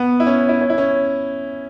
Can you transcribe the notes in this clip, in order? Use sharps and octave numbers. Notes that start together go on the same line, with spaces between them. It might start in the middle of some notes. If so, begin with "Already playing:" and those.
Already playing: B3
E4
C#4
E4
C#4
E4
C#4